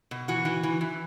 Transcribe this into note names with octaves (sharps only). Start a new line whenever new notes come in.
B2
E3 F#4
E3
E3
E3